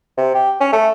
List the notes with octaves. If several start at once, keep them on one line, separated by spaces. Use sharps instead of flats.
C3
G4
C#4
A3